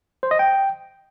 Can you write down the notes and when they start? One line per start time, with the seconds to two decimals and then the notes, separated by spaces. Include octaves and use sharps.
0.23 C5
0.31 D#5
0.39 G5